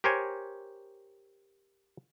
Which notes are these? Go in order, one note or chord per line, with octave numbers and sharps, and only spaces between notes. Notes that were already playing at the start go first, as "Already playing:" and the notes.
G4 A#4 C5 C#5 G#5